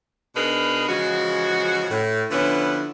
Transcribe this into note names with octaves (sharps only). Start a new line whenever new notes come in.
B2 D4 D#4 G#4 A#4 B4
C#3 E3 F3 G#3 F#4
A2
D3 F3 B3 C#4 E4 B4